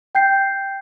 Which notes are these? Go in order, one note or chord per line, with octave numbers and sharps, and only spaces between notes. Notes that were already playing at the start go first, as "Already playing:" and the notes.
G5 G6 C7